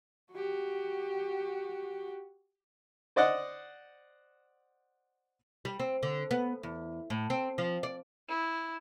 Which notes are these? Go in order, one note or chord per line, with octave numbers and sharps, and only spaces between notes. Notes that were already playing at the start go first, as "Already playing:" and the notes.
F#4 G4
C5 D5 D#5 F#5
G3
C4
D3
B3
E2
A2
C4
F3
D5
E4